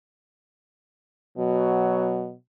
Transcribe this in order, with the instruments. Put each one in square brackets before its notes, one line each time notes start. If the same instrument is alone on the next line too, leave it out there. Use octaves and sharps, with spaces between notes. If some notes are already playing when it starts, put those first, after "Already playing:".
[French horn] B2 [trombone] F#3